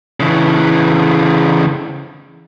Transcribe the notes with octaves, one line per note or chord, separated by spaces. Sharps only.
C#3 E3